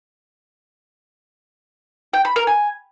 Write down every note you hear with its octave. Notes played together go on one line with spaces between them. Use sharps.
G5
B5
A#4
G#5